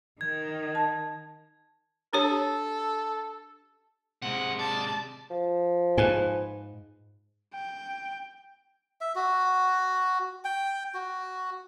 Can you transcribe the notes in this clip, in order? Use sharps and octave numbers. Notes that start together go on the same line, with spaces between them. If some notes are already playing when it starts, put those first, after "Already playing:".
D#3 G#6
A5
D4 G4 A4 C#5
C3 G#3 F#5
D5 A5
F3
G#2 B4 G#5
G5
E5
F#4
G5
F#4